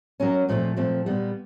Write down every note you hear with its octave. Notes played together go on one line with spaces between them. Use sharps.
F#3 A#3 C#4
A#2 F3 A3 C4
A#2 F3 A3 C4
A#2 G3 B3